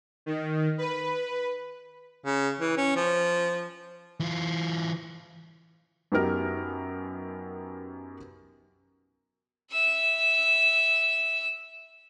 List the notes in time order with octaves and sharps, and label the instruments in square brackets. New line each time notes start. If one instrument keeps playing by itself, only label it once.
[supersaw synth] D#3
B4
[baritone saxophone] C#3
E3
C#4
F3
[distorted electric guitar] E3 F4
[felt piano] F#2 B3 D#4 G4 A#4 F6
[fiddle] E5 E6